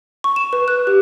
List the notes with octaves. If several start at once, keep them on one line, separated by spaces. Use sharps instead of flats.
C#6
E7
B4
F#6
G4